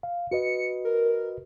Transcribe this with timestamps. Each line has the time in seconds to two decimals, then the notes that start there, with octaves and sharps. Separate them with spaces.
0.03 F5
0.31 F#4 B4 D#5 C#7
0.85 A#4